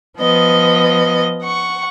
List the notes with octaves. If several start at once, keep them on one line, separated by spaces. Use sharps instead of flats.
F3 B3 D#5
F#5 C#6